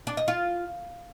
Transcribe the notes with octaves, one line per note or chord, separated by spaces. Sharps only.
D4
D#5
F4